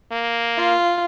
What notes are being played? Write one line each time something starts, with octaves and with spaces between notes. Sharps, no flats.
A#3
F4